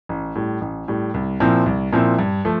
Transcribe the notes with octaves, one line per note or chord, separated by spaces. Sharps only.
A1
A2 G3
A1
A2 G3
C2
A#2 F3 C4 E4
C2
A#2 F3 C4 E4
G2
F3 A3